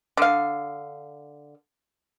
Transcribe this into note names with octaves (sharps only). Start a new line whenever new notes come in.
D3 F5